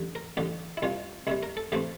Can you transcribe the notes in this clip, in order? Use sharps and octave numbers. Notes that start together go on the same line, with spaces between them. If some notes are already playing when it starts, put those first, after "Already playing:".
Already playing: A1 G2 D3
A#4
A1 G2 D3 G4
E4
C2 C3 G3 F4
C2 C3 G3 E4
A#4
A4
A2 E3 A3 C4 G4